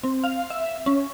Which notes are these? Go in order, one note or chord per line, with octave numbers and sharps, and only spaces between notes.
C4
F5
E5
C#4